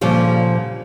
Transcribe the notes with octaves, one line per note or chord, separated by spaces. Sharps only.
D2 A#2 C#3 F3 G3